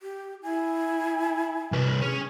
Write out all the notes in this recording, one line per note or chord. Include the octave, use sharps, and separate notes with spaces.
G4
E4 G#5
C2 B4
C#4 G#4